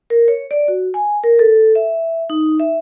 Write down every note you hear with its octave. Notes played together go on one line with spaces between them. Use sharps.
A#4
C#5
D5
F#4
G#5
A#4
A4
E5
D#4
E5